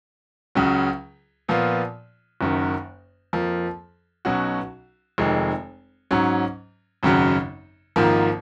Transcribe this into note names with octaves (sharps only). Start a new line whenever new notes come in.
C#2 C#3 F#3
A#2 F3 B3 F4
F#1 F#2 D#3
F2 F3 A#3
B1 B2 F#3 C#4 F#4
F1 F2 D#3 G#3
G#2 F#3 C#4
G#1 F#2 C#3 F#3
G#1 G#2 F3 A#3